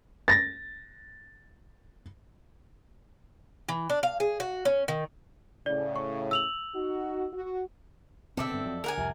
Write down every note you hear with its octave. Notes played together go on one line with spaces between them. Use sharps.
A6 A#6
E3
D4
F5
G#4
F#4
C#4
D#3
A2 C#3 D5
C#6
E6 F7 F#7
D#4 F#4
F#4
B2 D3 B3 C4 A4 D5 E5
G2 D3 B3
F2 F#3
D3 A#4 F#5 G#5
C2 F2 A2 C3